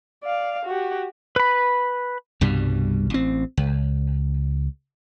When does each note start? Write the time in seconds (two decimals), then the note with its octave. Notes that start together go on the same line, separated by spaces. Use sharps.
0.24 D5 F5
0.65 F#4 G4
1.36 B4 B5
2.41 C2 G2 B2 G3
3.10 A1 C4
3.57 C#2